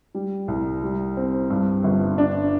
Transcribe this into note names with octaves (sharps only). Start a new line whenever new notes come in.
G3
C2
G3
C4
G2
G1
D4